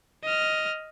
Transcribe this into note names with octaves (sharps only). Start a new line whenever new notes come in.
D#5 F6